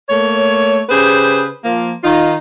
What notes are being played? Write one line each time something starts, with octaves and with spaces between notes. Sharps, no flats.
A3 A#3 C#5
C#3 G4 G#4 B4 C5
F3 A#3
D#3 D#4 F4